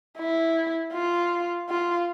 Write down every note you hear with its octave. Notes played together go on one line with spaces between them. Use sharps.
E4
F4
F4